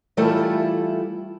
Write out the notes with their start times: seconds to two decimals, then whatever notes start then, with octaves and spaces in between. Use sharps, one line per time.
0.17 E3 G3 A3 E4 F4 A4